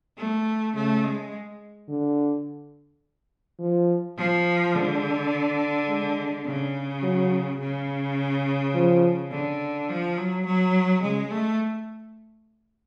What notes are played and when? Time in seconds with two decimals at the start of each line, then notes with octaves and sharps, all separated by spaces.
0.17 A3
0.75 C#3 A3
1.04 G#3
1.89 D3
3.60 F3
4.17 F3
4.74 D3 G#3
5.89 G#3
6.45 C#3
7.03 F#3
7.60 C#3
8.74 F3
9.31 D3
9.89 F3
10.17 F#3
10.45 F#3
11.02 C#3 G#3
11.31 A3